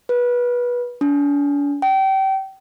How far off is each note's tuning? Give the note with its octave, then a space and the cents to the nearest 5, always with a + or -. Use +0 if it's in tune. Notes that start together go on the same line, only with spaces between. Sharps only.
B4 -20
D4 -40
G5 -30